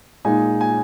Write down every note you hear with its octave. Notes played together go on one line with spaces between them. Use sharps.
A#2 G#3 D#4 G#5
G#5